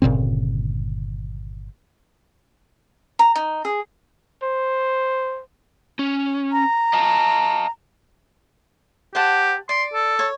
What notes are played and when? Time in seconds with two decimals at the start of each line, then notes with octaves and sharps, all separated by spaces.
0.02 G1 A#2 C#3 C4
3.19 A#5
3.36 D#4
3.65 G#4
4.43 C5
5.99 C#4
6.52 A#5
6.93 D#5 F5 A5
9.15 G4 C5 F#5 A5
9.69 D5 C6
9.94 A4
10.19 C#5